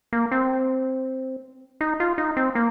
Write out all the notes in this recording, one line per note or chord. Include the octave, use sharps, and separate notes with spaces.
A#3
C4
D#4
F4
D#4
C4
A#3